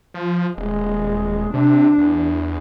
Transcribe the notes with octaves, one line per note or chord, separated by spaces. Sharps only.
F3
D#1 G#3
C3 D4
E2